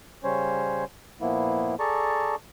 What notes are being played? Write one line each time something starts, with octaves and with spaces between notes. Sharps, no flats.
C#3 G3 C#4 C5 C#5
A#2 F3 A#3 B3 E4
G#4 A4 D5 A5 A#5 C#6